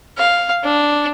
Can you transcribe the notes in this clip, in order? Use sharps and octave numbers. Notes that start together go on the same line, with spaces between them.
F5
D4